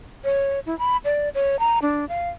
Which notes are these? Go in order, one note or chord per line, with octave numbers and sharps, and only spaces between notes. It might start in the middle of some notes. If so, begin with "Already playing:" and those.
C#5
E4
B5
D5
C#5
A#5
D4
F5